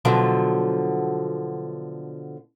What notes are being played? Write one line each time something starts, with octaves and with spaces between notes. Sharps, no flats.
B2 D3 F3 F#3